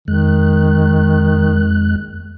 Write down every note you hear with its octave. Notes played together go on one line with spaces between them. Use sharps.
F2 D#3 G#3 F#6